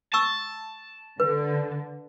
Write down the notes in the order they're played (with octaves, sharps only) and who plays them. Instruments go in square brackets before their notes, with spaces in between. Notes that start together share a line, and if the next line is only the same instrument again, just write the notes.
[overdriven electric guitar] A5 [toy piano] C#6 E6
[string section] D3 [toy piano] B4